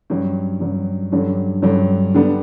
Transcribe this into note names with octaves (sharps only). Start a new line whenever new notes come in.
G2 F#3 C#4
G2 F#3 C#4
G2 D3 F#3 C#4
G2 D3 F#3 C#4
D3 G3 B3 D4